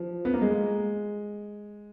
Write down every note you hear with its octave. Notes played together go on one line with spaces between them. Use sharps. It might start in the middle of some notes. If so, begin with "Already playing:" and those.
Already playing: F3
B3
A#3
G#3